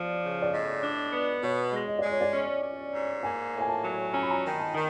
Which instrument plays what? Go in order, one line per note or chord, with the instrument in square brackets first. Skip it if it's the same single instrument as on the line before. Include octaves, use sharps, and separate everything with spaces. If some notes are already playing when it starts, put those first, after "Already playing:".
Already playing: [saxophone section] F3 [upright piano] D5
[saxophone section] C#3
[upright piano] D5
[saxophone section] A2 [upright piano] D#5
[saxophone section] D4
B3
[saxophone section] B2 [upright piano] C#5
[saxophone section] G#3
[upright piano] D#5
[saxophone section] G#3 [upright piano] D5
[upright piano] C#5
D5
[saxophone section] C#4
C#4
G#2
[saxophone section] A#3 [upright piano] G#5
[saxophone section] A2
[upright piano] G#5
A5
[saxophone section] F#3
[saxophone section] C#4 [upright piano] A#5
[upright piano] B5
A#5
[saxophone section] D#3
[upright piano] A5
[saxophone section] D#3